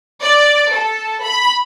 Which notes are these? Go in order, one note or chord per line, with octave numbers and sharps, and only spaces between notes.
D5
A4
B5